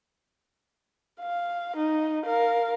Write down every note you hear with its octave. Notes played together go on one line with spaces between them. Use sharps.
F5
D#4
A#4 F5